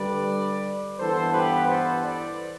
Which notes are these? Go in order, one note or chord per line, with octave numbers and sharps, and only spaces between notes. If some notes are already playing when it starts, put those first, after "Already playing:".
Already playing: D3 G3 D4 B4 D5
G2 E3 B3 A4 C5
G4 B4
A4 C5
B4 D5